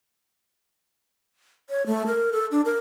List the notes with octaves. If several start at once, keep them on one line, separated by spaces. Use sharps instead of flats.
C#5
A3
A#4
A4
D4
A#4